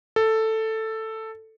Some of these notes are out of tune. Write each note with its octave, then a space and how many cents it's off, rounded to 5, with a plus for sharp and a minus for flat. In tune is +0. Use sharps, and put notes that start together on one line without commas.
A4 +5